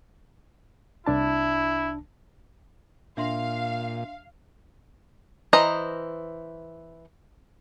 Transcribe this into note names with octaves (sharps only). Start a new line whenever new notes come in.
C2 D4 E4 A5
A#2 D4 E5 F5 C6
E3 C5 D#5 A#5